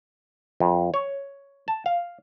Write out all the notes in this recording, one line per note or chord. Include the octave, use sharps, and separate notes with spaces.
F2
C#5
A5
F5